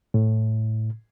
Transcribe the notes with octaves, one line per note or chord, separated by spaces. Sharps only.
A2